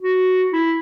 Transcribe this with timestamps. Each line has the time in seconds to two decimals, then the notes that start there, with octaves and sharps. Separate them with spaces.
0.02 F#4
0.53 E4